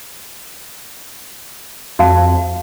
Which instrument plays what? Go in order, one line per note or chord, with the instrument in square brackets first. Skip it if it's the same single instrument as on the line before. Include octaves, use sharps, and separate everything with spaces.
[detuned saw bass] F2 [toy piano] F#4 F5 A5